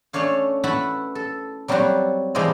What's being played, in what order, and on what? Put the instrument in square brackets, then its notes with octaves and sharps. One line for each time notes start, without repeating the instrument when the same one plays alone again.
[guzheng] A3 C#4 D4 C#5 F5
E4 F#4 B4 F#5 A5 B5
A4
F#3 G3 C4 F4 F#4
C3 E3 F3 G3 G#3 C4